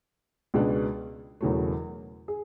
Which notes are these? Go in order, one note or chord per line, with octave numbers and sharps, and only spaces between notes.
C#2 B2 G#3 D4
E1 E2 C#3 F#3 A3
G#4